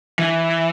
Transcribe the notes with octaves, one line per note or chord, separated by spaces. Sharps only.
E3